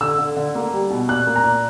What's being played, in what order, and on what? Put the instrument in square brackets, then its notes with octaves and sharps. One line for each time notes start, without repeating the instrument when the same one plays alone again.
[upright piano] D3 E6
D3
D3
A#3
G3
B2
A#2 F#6
A#3
A#5
A#2